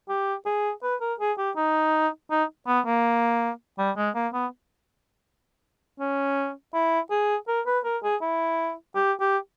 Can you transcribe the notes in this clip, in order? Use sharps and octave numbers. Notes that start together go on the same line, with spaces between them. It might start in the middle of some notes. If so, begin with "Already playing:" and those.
G4
G#4
B4
A#4
G#4
G4
D#4
D#4
B3
A#3
G3
G#3
A#3
B3
C#4
E4
G#4
A#4
B4
A#4
G#4
E4
G4
G4